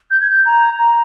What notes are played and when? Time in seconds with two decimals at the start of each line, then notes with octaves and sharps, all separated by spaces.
0.10 G6
0.20 G#6
0.29 G6
0.45 A#5
0.78 A#5